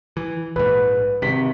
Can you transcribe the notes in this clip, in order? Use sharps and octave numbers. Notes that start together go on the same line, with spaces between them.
E3
A#1 G#2 B4
G#1 C3 B6